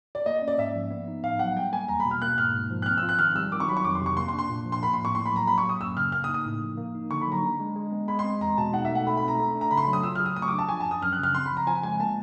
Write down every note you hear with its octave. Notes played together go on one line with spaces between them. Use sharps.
D5
A#3 D#5
C#4
D5
G#2 E5
F3
B3
D#4
A2 F5
F#3 F#5
G3 G5
A#3 G#5
E2 A#5
B5
B2
F6
A#3 F#6
G#2 F6
G#2
F3
F#6
C4 F6
E6
F4
F#6
D#3 F6
G3 E6
D#3 D6
C#6
F#3 B5
C#6
F2 D6
C6
C3 C#6
A#3 C6
C6
D4
C6
A#2
F3
C6
A#3 B5
C6
A2
C#6
A2 C6
B5
F#3
A#5
F#3 B5
C#6
A#3
D#6
F#2 E6
C#3 F6
A#3 F6
D#6
D#4
D#6
A2
F3
A#3
D#4
D3 C#6
B5
F#3 A#5
D4
G#3
G#3
B3
G#3 B5
C6
C4
E2 A#5
B2 A5
D#4 F#5
A3 E5
F#5
A3 B5
B5
C4
A#5
A3
D4
A#5
C#3 B5
C6
B5
F#3
D#6
F4 E6
G#4 F6
D#6
A3 D#6
C#6
D6
D4
A5
F3 G#5
F#2 A5
D#6
F#2 F6
F#6
C#3 F6
C4 C6
B5
F3
A#5
F3 G#5
G#3 G#5
A#3 A5